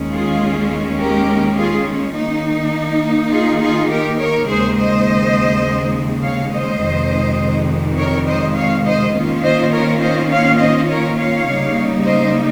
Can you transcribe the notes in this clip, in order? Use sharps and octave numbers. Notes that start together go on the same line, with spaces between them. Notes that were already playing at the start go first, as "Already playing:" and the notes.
Already playing: D#2 D#3 G#3 C#4
F4 G#4
G4 A#4
F4 G#4
D#3 A#3 D#4
F4 G#4
F4 G#4
G4 A#4
A#4 C#5
D#2 C#3 G#3 G#4 C5
C5 D#5
C#5 F5
C5 D#5
F2 C3 D#3 G#3
A#4 C#5
C5 D#5
C#5 F5
C5 D#5
D#3 A#3 C#4 F4
C5 D#5
A#4 C#5
C5 D#5
C#5 F5
C5 D#5
A#4 C#5
C#5 F5
C#3 G3 A#3 D#4
C5 D#5